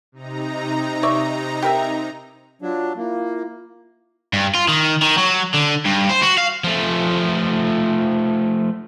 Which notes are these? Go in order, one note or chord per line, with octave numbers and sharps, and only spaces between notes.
C3 D#4 A#5
C#5 D5 E5
G4 A#4 E5
F#3 D4 F4
A#3 E4 F4
G2
F4
D#3
D#3
F#3
D3
G2
C5
F#4
F5
F3 A3